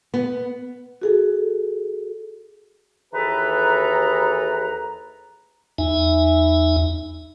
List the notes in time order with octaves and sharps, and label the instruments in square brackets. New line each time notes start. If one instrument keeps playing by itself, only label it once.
[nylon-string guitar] B3
[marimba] F#4 G#4 A4
[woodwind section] D#2 E3 G#4 A4 B4 A#5
[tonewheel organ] E2 D#4 E5 G#5